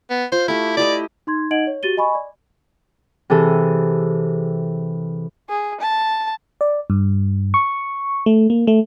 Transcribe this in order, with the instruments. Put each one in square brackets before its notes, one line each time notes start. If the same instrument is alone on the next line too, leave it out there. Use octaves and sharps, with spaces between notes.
[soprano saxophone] B3
[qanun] F4 [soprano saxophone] C5
[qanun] A3 G4 [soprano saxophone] E4
[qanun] E4 G4 D#5 [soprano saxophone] D5
[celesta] D#4 C6 G#6
D#4 D#5 F#5 G#6 D7 F#7
C#5
F#4 G4 A6 D#7 G7
D#5 G#5 B5 C#6
D5
[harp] C3 E3 G#4 A4
[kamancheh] G#4
A5
[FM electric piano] D5
G2
C#6
A3
A#3
A3